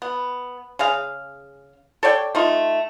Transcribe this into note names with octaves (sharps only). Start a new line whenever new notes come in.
B3
C#3 G#4 F5
A4 C#5 D5 G5
A3 D#4 F4